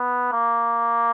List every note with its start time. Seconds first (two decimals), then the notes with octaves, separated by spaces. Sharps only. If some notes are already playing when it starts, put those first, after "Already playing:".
Already playing: B3
0.33 A#3